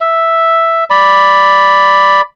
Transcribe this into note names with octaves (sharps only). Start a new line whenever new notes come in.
E5
D5 B5